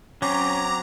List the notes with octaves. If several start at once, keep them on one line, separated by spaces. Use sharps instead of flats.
F#3 C4 C#4 A#5 D6